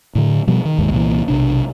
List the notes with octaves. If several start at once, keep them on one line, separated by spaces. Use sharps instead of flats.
A2 D3
B2 F3 G3
D#3
E1 D#2 G#2
C2 A#2 E3
B1 C3 D4